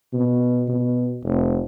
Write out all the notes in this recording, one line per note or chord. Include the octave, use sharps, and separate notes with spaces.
B2
B2
F1